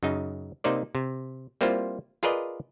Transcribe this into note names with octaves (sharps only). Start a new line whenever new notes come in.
F#2 C#3 D#4
C3 A#3 D#4 C5 D5
C3
G3 A#3 C4 E4 F4 C5
F4 G#4 A#4 B4 D5 D#5